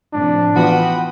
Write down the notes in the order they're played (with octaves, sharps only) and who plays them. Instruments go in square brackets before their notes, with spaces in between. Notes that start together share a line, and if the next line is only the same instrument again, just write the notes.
[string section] A2 C3 F3 [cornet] D4
[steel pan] E3 B3 F4 [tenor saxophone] F#4 [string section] G5 B5 D#6